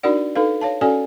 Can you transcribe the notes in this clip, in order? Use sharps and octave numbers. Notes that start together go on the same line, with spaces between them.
D4 D#4 F#4 A#4 D5 F#5
D#4 A4 B4 F5
C#5 F5 A5
C#4 F#4 A4 D5 F5 G#5